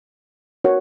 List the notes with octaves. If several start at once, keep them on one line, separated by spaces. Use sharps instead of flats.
F#4 A#4 C#5 F#5